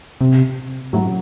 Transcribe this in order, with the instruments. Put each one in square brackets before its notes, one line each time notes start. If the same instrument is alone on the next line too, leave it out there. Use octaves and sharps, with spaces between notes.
[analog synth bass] C3
[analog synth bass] A2 [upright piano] F#3